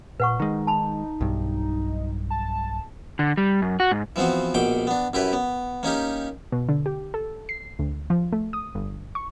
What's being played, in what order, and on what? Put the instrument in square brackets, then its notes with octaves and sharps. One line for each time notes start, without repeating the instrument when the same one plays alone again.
[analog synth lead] A#2 [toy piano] B4 F#5 C#6
[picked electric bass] D#3 G#3 [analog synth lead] D#4
[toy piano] A5 B5
[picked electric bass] B1 G2
[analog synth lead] A5
[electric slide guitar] D3
G3
F#2
F#4
G#2
[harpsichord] E3 F3 B3 C4 F#4
A#1 B2 G5 D6
B3 D4
F#2 E4 G4 B4
B3
A#3 C#4 D#4 G4
[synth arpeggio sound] B2
D3
G4
A4
C7
D2
F3
A3
D#6
G1
C#6